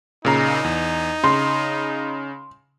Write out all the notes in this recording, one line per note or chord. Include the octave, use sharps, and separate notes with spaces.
A#2 C#3 D#4 A#5
E2
C#3 C6